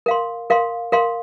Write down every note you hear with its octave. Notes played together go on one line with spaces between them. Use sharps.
A#4 F5 C6
A#4 F5 C6
A#4 F5 C6